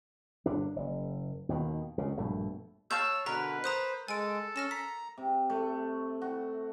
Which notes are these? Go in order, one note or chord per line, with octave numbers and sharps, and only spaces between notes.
G1 A#2 D4
F#1
D#2 B2 D#3
C#2 C#3
A#1 G2 B2 A3
C#5 F5 A5 E6 G6
B2 D3 A#4 B4 A#5
C5 A#5 D#6 F#6
G#3 A4 G#5 D7
C#4 F6 A#6 E7
A#5 B6
C3
A3
F#4